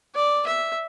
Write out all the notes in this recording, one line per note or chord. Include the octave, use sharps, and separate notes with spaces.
D5
E5